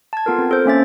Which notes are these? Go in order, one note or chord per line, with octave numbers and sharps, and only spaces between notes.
A5 G#6
B3 F4 A4 A#4
C4
A4 C5
A#3 C#4 E5 A6